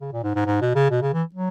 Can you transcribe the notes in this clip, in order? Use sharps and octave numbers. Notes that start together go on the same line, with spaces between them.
C#3
A#2
G#2
G#2
G#2
B2
C#3
B2
C#3
E3
F#3